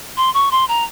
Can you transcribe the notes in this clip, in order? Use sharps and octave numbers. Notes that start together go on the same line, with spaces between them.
C6
C#6
C6
A#5